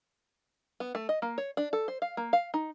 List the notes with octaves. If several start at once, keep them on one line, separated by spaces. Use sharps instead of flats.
B3
A3
D#5
A#3
C#5
D4
A4
C5
F5
A#3
F5
D#4